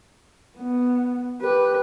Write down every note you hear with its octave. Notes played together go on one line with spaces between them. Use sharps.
B3
G4 B4